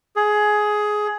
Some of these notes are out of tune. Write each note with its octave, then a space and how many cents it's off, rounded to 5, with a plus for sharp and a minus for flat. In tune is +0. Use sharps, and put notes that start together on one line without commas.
G#4 +15